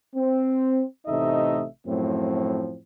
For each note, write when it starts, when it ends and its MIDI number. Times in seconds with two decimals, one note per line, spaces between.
0.15 0.81 60
1.07 1.64 33
1.07 1.64 48
1.07 1.64 57
1.07 1.64 63
1.07 1.64 75
1.07 1.64 76
1.87 2.76 42
1.87 2.76 45
1.87 2.76 53
1.87 2.76 57
1.87 2.76 60